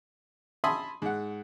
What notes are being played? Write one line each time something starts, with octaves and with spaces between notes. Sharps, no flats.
E5 G#5 A5 B5 C6 D#6
G#2 F#5